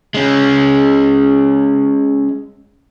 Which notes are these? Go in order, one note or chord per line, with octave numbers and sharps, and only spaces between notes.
G#3 C#4